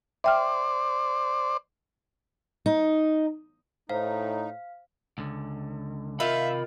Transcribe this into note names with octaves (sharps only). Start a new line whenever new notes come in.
C5 D5 E5 G5 F6
D#4
A2 D#4 C5 F5
C#2 D3
C3 D#3 F4 E5 F5 B5